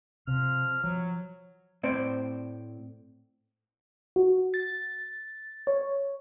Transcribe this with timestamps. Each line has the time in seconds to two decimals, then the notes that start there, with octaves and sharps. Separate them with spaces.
0.28 C3 F3 F6
0.84 F3 F#3
1.83 A2 C4 C5 D5
4.16 F#4
4.54 A6
5.67 C#5